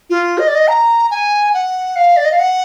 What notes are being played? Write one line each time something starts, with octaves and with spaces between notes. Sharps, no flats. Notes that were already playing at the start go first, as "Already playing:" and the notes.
F4
D#5
D5
D#5
A#5
G#5
F#5
F5
D5
D#5
F5
F#5